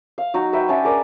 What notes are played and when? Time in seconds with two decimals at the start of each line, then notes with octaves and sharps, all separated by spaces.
0.18 F5
0.34 F#3 D#4 F#4
0.53 B4 E5 G5
0.69 C#4 D4 E5 F#5
0.84 G#4 A#4 D5